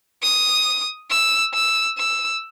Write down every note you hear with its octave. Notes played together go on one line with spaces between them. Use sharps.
D#6
E6
E6
E6